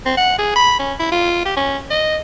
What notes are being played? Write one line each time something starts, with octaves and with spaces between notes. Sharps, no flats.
C4
F#5
G#4
B5
C#4
E4
F4
G4
C#4
D#5